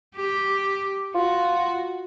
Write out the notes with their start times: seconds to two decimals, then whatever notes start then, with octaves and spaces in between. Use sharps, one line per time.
0.16 G4
1.15 F4 F#4